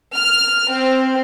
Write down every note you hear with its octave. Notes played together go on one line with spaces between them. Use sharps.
F6
C4